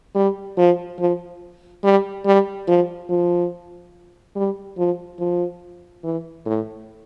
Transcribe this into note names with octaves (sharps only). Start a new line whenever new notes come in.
G3
F3
F3
G3
G3
F3
F3
G3
F3
F3
E3
A2